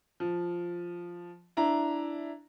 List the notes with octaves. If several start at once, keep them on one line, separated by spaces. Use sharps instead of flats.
F3
D4 E4 A#5